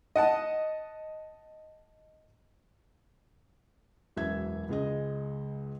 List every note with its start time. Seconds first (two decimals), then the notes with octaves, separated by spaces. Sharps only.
0.16 D#5 F#5 A5
4.16 E1 F#2 E3 E5 G#6
4.69 C#2 C#3 G#3 D#5